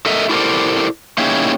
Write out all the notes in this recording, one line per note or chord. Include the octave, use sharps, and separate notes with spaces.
A4 A#4 D#5 E5
E4 G4 A4 A#4 C5 D5
A#3 C#4 D#4 E4 G4 G#4